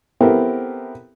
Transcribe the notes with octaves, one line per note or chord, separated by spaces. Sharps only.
B3 C4 E4 G4 A4 A#4